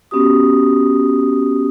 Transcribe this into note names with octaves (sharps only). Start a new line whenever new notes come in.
B3 C#4 F#4 G4 D#6